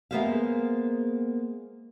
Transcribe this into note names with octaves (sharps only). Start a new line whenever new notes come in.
G#3 A#3 B3 C5 E5 F5